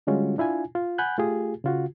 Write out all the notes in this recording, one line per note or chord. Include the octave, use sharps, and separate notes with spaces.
D3 G3 G#3 C#4 F4 F#4
D4 E4 F4 G#5
F4
F#5 G#5 B5 F#6 G6
A3 F4 G4 G#4
C#3 F4 F#4